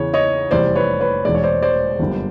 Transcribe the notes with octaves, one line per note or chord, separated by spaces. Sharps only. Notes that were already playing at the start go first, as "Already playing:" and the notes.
Already playing: E2 C#3 E3 C#5
C#5 D#5
F1 E2 C3 E3 G3 C5 D5
B4 C#5
B4 C#5
E1 E2 B2 G#3 D5
C#5
C5 D5
C5 D5
G1 F#2 D3 G3 A#3